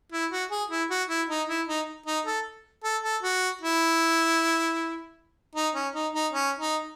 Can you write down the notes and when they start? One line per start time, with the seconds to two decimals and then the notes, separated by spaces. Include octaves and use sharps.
0.12 E4
0.32 F#4
0.51 G#4
0.71 E4
0.90 F#4
1.09 E4
1.29 D#4
1.48 E4
1.68 D#4
2.06 D#4
2.26 A4
2.84 A4
3.04 A4
3.23 F#4
3.62 E4
5.55 D#4
5.75 C#4
5.94 D#4
6.14 D#4
6.33 C#4
6.59 D#4